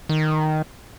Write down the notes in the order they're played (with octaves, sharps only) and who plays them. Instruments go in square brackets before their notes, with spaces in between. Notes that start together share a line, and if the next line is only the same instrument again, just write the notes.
[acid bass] D#3